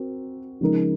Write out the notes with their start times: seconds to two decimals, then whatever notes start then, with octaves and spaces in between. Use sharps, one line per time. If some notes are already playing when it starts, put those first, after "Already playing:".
Already playing: C4 F#4 A#4
0.61 C#3 F3 G#3 D#4 A#4